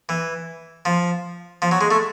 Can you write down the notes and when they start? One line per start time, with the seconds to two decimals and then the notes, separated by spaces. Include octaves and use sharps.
0.09 E3
0.85 F3
1.62 F3
1.71 F#3
1.81 G#3
1.91 A3